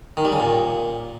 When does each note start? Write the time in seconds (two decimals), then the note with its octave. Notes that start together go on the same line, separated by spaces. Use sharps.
0.17 D#3
0.25 G3
0.32 C#3
0.40 A#2